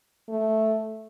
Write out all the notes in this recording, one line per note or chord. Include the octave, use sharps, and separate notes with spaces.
A3